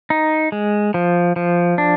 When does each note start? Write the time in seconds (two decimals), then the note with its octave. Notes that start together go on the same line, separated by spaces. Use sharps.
0.10 D#4
0.52 G#3
0.94 F3
1.36 F3
1.78 D4